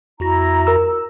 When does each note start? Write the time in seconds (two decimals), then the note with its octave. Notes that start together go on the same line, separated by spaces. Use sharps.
0.20 F2 E4 F#4 A#5 A#6
0.67 A#4 E6